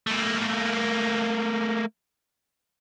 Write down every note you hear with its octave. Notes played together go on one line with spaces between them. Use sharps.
A3 A#3